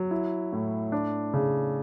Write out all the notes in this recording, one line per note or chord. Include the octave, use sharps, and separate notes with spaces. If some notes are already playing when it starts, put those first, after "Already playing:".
Already playing: F#3
E4
A2
D4
C#3